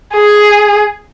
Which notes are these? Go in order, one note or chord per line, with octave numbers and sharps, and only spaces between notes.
G#4